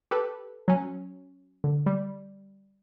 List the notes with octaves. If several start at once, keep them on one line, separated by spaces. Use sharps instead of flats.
G4 A4 B4
F#3 C#4
D3
G3